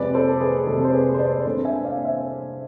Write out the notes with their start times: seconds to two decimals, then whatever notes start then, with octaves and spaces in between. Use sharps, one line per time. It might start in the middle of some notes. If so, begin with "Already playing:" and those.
Already playing: F2 C3 G#3 B4 D5
0.14 A4 C5
0.41 G#4 B4
0.67 F2 C3 G#3 A4
0.85 C5
0.93 G#4 B4
1.14 C5
1.19 B4 D5
1.45 C2 C3 G#3 D4 A4 C5
1.65 E5 G#5
1.84 D5 F5
2.04 C5 E5